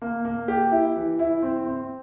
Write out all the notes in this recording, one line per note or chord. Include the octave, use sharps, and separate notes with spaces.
A#3
A#3
G4
E4
E3
E4
C4
C4